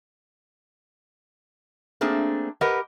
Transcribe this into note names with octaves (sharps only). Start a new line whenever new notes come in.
A3 A#3 C4 D4 G#4
G4 A#4 B4 D#5 F#5